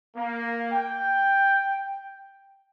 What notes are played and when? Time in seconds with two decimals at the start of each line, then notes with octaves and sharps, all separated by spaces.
0.16 A#3
0.72 G5